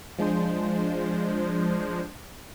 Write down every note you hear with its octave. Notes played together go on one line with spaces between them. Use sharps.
F3 G#3 D4 C5